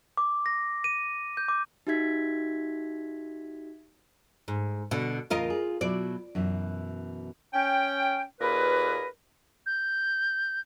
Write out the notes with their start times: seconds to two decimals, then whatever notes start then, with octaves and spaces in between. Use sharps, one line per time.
0.17 D6
0.46 A#6
0.84 D#7
1.37 G6
1.48 D6
1.87 D#4 F#4 G4 E5 G#6 B6
4.48 G#2
4.91 B2 D3
5.30 E2 A2 C#3 F4 A#4 D#5
5.50 G#4
5.81 B2 F#3 E4 D5
6.35 F#2 B2 E3
7.53 C#4 G5
8.41 D#2 A#2 G#4 A#4 B4
9.66 G6